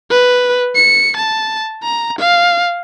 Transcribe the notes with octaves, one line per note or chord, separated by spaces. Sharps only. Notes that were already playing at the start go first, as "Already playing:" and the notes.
B4
C#7
A5
A#5
F5